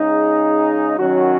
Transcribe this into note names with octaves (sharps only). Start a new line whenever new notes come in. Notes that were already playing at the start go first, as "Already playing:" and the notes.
Already playing: C#3 G#3 D#4 G#4
F#2 D#3 F#3 C#4 F#4